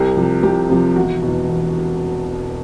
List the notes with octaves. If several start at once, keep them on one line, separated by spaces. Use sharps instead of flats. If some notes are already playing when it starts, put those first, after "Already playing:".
Already playing: C2 G4
C3 F3
C2 G4
C3 F3
E1 F#4
E2 B2
E1